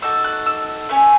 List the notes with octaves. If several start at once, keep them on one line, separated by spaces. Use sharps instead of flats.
D#4 F#4 A4 E6
F#6
E6
A3 C#4 G#4 E5